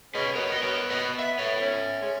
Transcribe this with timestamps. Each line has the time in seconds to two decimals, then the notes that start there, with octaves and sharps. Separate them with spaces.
0.14 G#3 C#4 B4 D#5
0.35 B3 A#4 C#5
0.52 D#5
0.63 A#4 C#5
0.91 B4 D#5
1.19 B3 E5
1.39 C#5 E5
1.60 C#4
2.02 G#3 C#4